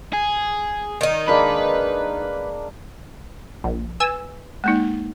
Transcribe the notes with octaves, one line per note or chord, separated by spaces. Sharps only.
G#4
D#3 D#4
G#3 A#3 D4 B4
A#1
B4 G#5 E6
G#3 A#3 D#4